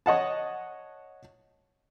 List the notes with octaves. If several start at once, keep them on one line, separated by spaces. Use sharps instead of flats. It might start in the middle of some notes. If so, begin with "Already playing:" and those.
C#5 D#5 F#5 A5